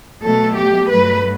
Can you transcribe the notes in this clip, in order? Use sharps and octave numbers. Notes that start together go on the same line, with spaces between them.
B2 F#3 A3 A4
G4
G2 F#3 A3 B4